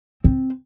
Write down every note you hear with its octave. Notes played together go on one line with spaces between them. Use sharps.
C4